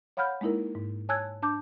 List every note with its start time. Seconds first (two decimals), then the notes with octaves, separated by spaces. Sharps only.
0.17 C#5 F5 F#5 B5 F6 G6
0.41 G#3 A#3 D#4 E4 A#4
0.75 G#2
1.09 C#5 G#5 A5 E6 F#6 G#6
1.42 D4 A5 D6 G6